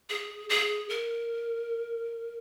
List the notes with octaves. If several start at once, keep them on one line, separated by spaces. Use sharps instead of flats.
G#4
G#4
A#4